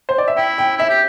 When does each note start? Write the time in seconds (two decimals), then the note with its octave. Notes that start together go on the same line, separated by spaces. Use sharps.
0.09 C5
0.18 D5
0.28 E5
0.37 E4 G5
0.58 G5
0.77 E4 E5
0.89 G4